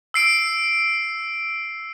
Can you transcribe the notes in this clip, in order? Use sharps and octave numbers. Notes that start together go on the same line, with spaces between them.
E6 C7 D7